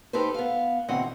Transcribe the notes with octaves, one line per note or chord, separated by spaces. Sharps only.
D#4 G4 A4 B4 C5
B3 F5
B2 D3 E3 C4 D#5 F#5